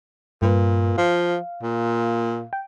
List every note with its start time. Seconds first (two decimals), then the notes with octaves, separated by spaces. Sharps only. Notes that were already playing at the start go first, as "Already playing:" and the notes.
0.42 G2 A#2 B4
0.98 F3 F5
1.63 A#2
2.53 G5